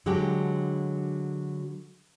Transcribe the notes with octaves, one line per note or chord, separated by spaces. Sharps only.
D3 F#3 G#3 D4 G4